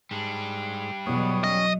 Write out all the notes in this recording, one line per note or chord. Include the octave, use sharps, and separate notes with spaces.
G#2 G3 D4
E2 B2 F#3 B3 C#5 D#6
F#3 C#4 D#5